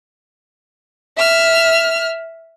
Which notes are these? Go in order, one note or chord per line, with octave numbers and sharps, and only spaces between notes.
E5 F6